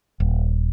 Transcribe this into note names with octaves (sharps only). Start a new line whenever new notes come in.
D#1